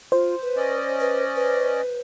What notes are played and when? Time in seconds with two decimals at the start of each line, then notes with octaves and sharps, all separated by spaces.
0.12 F4 C5
0.42 B4
0.57 C#4 D5 D#5
1.00 B4
1.36 B4